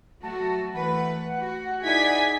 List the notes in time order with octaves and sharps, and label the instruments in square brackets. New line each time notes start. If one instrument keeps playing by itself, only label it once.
[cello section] F#3 A3 F#4 [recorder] A5
[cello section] E3 A3 B4 [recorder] F#5
[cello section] F#4
[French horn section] D#4 E4 [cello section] G#4 D5 [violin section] G#5 G#6 B6